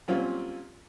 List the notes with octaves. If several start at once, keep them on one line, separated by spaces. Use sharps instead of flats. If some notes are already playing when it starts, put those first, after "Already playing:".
F#2 A#2 G3 C4 C#4 F4